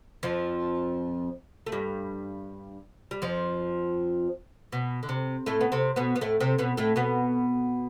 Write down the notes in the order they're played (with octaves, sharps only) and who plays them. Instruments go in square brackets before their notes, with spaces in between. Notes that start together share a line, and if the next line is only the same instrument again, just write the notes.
[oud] F2 F3
A3
G2 G3
G3
F2 F3
B2
D3
C3
A2 A3
B3
C3 C4
B2 B3
B3
A2 A3
C3 C4
B2 B3
A2 A3
B2 B3